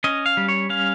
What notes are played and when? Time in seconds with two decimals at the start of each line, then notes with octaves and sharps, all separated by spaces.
0.04 C#4 D#5
0.26 F5
0.37 G3
0.48 C#5
0.70 C#4 F5